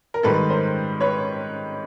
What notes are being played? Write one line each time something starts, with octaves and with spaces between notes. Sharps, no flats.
A#4
G#2 D#3 G3 A4 B4
A#4 C5
B4 C#5